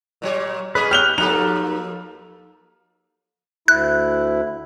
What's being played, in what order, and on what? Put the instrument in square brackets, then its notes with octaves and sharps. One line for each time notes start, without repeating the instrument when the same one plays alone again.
[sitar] A#2 F#3 C#5
[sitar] A#3 C#4 G#4 [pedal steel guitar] B4 D#5
[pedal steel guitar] G4 F#6 [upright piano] F6 F7 G7
[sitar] F3 A#3 A4 [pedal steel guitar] D#4 G4 [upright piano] F7
[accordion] D2 E4 [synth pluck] F#6